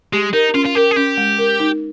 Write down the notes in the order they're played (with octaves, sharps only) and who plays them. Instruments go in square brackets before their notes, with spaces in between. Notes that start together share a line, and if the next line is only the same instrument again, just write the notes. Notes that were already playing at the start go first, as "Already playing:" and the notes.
[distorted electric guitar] G#3 [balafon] G4
[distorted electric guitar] D#4 [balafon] A#4
[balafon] C#4 [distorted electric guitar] F4
[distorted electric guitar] F4
[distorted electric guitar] G4 [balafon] A#4
[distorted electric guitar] G#4
[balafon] C#4 [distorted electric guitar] G4
[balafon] G#3
A#4
D#4